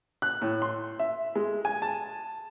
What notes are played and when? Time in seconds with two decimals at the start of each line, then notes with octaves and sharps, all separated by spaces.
0.22 F#6
0.42 A2
0.62 C6
0.99 E5
1.36 G#3
1.65 G#5
1.82 A5